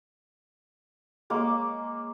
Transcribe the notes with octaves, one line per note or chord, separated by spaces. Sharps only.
G#3 A#3 C#5 D6